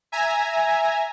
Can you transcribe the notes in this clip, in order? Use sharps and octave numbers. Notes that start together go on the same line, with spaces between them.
E5 G#5 A#5